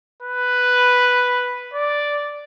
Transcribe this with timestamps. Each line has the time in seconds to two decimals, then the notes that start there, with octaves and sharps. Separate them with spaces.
0.22 B4
1.74 D5